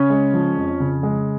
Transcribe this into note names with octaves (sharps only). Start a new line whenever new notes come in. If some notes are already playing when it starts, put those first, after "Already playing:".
Already playing: C#3 C#4 C#5
G#3
F3
F2
C#3
G#3